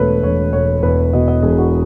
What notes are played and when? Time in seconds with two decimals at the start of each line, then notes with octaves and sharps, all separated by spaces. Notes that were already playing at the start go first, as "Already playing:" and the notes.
Already playing: E1 B2 A3 B4 C#5
0.23 E1 C#5
0.53 E1 C#5
0.83 E2 B4
1.13 B2 D#5
1.28 D#5
1.43 E1 G#4
1.58 F#4